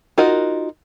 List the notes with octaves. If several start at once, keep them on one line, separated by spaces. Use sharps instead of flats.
D#4 F4 F#4 A#4 D#5